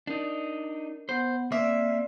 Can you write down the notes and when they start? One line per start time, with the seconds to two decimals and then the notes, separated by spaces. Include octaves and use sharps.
0.07 D4 D#4 A#4
1.09 B3 C5 F#5
1.52 A#3 C4 D5 E5